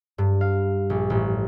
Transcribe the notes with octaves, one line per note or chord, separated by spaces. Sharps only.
G2
F5
A#1
A1